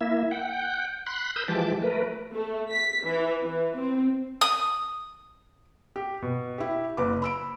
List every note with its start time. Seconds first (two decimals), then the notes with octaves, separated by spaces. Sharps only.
0.01 A#3 E4 E5
0.31 F#5 G5
1.06 B5 C6 F#6
1.36 A#4 B5 D#6 E6 G6
1.48 E3 F3 G#3 G4 A5 D6
1.82 A3 A#4 B4
2.32 A3
2.70 B6
3.04 E3
3.44 E3
3.78 C4
4.41 D#6
5.96 G4
6.22 B2
6.58 E4 G4
6.97 F#1 B4 D6
7.22 B5 E6 D7